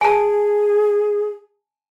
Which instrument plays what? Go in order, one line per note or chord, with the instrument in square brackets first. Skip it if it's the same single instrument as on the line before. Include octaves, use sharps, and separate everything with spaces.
[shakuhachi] G#4 [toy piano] G#5 A5